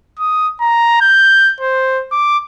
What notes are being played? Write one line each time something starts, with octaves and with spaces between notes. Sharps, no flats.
D#6
A#5
G6
C5
D6